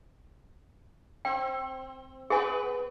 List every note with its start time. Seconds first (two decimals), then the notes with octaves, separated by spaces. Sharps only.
1.25 C4 G5
2.30 B3 G#4 B4 G#5